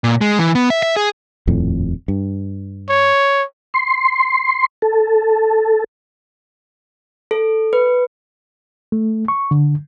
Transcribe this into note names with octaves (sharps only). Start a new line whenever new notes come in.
A#2
G#3
E3
B3
E5
E5
G#4
D#1 F2 A2
G2
C#5
C6
A4
A4
B4
A3
C#6
D3